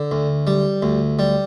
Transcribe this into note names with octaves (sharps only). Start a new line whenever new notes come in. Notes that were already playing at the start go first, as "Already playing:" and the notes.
Already playing: D3
D2
G3
D2
G3